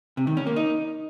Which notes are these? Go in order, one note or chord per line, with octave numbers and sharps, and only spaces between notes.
C3
D#3
C#4
A#3
D#4